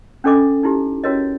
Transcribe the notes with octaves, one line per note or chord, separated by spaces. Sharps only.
C#4 D4 A4 D#5 D6
D#4 E4 G4
C#4 E4 F#4 A#4 C#5 D#5